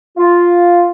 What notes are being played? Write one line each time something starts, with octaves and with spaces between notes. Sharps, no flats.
F4